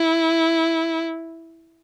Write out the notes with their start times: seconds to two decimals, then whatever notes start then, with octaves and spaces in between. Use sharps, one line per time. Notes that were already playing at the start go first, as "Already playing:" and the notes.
Already playing: E4